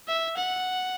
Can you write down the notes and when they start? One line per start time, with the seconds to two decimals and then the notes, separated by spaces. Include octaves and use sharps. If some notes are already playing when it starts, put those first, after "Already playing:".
0.08 E5
0.37 F#5